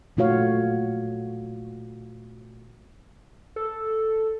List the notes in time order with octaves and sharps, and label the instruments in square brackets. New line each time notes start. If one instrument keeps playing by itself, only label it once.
[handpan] A#2 A3 F4 F#4 C#5 F5
[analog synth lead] A4